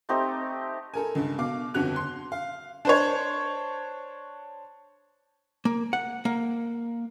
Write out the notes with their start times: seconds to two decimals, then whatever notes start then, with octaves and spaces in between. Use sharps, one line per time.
0.09 A3 C4 D#4 G4
0.94 A4 A#4 G#5
1.15 C#2 G2
1.38 B2 F5 D6
1.74 G1 F2 C#3 F#4 F#6 F7
1.96 C6
2.32 F5
2.85 D4 C5 C#5
5.65 A#3
5.93 F#5
6.25 A#3